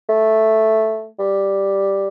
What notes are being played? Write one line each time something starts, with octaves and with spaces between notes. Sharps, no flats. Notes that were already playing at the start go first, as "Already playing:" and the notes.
A3
G3